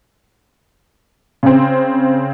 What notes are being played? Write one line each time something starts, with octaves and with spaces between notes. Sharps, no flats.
C#3 C4